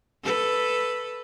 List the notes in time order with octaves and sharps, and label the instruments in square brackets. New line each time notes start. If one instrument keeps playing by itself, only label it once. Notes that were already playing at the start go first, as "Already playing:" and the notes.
[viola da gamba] A4 B4